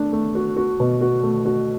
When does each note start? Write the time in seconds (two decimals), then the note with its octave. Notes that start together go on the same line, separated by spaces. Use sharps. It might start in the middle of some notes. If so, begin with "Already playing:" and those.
Already playing: A3 D4
0.13 A3
0.35 F#4
0.57 F#4
0.80 B2
1.01 F#4
1.23 A3
1.45 F#4